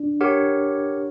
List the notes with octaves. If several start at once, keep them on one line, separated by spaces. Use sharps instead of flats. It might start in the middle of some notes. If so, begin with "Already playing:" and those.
Already playing: D4
G4 A#4 C#5 F#5